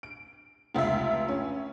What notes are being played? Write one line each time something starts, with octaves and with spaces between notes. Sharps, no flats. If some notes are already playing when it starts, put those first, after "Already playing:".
D7
F1 C#2 F4 E5
C#4